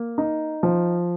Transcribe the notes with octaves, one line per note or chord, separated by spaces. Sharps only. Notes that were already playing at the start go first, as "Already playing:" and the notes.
Already playing: A#3
D#4
F3